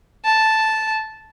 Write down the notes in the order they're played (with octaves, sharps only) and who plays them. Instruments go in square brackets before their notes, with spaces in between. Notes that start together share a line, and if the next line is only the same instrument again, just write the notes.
[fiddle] A5